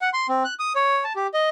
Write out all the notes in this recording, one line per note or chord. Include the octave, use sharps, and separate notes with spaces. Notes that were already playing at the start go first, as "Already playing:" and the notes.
F#5
C6
C4
F#6
D#6
C#5
A5
G4
D#5